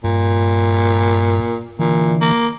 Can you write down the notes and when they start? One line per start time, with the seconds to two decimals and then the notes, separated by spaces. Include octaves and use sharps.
0.04 G2 A#2
1.79 A#2 D3 E3
2.21 A#3